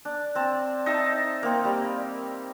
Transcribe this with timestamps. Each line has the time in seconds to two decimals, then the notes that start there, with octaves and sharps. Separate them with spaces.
0.05 D4
0.35 C4 A5
0.86 D#4 E5 A5
1.43 A#3 C4
1.65 G3